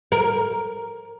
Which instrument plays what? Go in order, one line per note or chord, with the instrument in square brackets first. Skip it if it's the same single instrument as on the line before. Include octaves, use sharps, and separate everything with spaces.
[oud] A#4